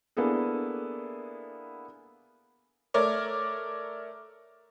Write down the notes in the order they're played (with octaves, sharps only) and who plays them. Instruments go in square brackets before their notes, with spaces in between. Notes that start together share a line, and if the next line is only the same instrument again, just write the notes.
[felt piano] A#3 B3 D4 E4 G#4 A4
[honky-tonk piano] A3 A#4 C#5 D5